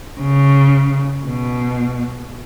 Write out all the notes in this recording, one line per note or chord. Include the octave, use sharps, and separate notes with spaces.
C#3
B2